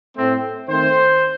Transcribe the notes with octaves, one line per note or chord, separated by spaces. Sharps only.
A2 A3 C4
D#3 A3 C4 C5